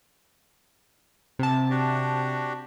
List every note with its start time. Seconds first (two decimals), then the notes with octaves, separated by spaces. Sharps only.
1.39 C3 A5
1.70 D4 F#4 G4